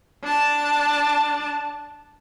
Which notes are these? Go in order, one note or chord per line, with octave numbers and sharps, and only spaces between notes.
D4 A5